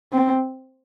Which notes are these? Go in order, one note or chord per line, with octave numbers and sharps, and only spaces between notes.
C4